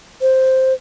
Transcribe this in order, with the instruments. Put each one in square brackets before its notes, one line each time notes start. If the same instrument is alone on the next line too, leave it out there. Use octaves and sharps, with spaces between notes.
[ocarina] C5